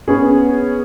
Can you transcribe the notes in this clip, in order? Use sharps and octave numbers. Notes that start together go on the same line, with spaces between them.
B3 C#4 G#4